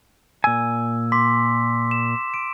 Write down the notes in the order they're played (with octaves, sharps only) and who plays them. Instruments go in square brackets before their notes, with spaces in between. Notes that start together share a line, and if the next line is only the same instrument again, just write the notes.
[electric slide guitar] A#2 G#5 [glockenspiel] E6
[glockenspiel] C6 D6 B6
E7
D7